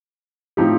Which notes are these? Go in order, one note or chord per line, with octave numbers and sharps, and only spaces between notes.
A2 F3 C4 D#4 G4